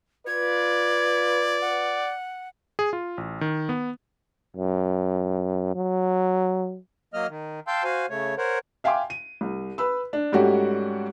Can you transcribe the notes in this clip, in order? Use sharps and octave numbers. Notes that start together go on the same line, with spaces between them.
F4 B4 D5 G#6
F#5
G#4
F4
A1
D#3
B3
F#2
F#3
F#3 A#3 D#5 F6
D#3
F5 G5 A5 C6 E6 G6
F#4 C5 F5 G#5
C#3 A3 C#5
A#4 C5 C#5 F#5
E5 F5 G5 G#5 C6 D6
D#7
C2
B4 B5 E6
D4
G#2 G3 A3 C#4 F#4 G4